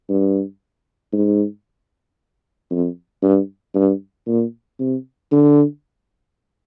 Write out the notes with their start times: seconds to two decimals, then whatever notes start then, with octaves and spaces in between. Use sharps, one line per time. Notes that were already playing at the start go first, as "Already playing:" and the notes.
0.09 G2
1.13 G#2
2.70 F2
3.23 G2
3.75 G2
4.27 A#2
4.79 C3
5.32 D3